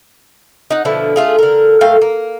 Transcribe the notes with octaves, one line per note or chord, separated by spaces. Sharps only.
D#4 F#5
B2 D3 F3 E4
A3 F4 G#4
D3 A#4
A#2 A3 F5 G5
A#3